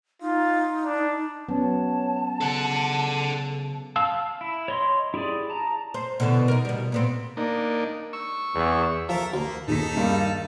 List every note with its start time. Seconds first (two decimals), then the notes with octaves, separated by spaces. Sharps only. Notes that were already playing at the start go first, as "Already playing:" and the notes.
0.22 D#4 F4
0.84 D4
1.49 F#3 B3 C#4 C#5 A5
2.41 C#3 A4 F#5
3.96 F5 A5 E6
4.41 E4
4.68 C#5 D#5 C6
5.14 E4 G4 G#4 D5
5.50 A5 A#5
5.94 C5
6.20 B2 D3 E3
6.48 D#4 A#4
6.65 B2 G3
6.92 A#2 B3 C4
7.37 A#3 D4 D#4
8.13 C#6 E6
8.54 E2
9.09 F3 A4 A#4 E5
9.34 D2 A#3
9.68 D#2 D#4 G#4 A4 B6
9.97 G2 G3 A#3